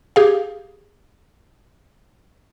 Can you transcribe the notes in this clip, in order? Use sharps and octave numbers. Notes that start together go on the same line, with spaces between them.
G4 G#4 F5